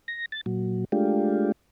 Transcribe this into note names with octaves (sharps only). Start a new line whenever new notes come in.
A#6
A6
A#2 F#3
G#3 A3 D4 F4 G4